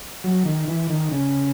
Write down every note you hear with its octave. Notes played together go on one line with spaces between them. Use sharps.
F#3
D#3
E3
D#3
C#3